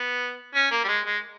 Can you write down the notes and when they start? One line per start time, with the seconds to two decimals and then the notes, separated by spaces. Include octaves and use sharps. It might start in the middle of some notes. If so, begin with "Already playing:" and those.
Already playing: B3
0.55 C#4
0.71 A#3
0.84 G3
0.88 G#3
1.06 G#3